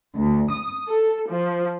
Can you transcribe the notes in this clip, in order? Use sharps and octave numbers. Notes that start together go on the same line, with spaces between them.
D2
D#6
A4
F3